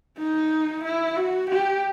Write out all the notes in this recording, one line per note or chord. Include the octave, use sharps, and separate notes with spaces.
D#4
E4
F#4
G4